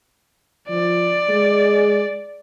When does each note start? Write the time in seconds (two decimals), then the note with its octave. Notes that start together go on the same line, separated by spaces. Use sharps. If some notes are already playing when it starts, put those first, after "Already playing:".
0.69 F3 D5
1.29 G#3